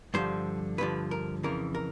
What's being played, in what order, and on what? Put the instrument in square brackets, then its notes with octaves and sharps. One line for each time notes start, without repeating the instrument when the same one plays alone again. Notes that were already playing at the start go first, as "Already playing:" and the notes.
[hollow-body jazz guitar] G2 D3 F3 C5
G2 D3 F3 B4
A#4
F2 C#3 E3 A#4
A#4